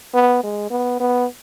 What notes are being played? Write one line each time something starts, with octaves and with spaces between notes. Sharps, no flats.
B3
G#3
B3
B3